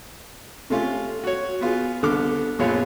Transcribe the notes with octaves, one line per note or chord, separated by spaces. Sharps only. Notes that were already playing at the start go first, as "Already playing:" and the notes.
C3 A3 C#4 F4
F#4 C#5
B3 F4 G#4
C2 D3 B3 D6 F6
A#1 F#2 B3 F4 C#5